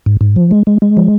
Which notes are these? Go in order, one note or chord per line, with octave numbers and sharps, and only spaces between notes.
G#2
G#2
F3
G#3
G#3
G#3
F3